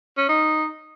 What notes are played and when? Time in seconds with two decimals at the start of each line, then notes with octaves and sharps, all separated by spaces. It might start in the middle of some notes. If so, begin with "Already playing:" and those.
0.17 C#4
0.29 D#4